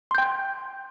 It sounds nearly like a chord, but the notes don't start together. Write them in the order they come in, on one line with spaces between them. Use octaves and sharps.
C6 G6 G5